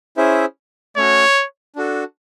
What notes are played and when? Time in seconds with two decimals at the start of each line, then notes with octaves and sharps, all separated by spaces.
0.17 C#4 E4 G#4 C5 E5
0.97 A3 C#4 F#4 C#5
1.76 D4 F#4 A4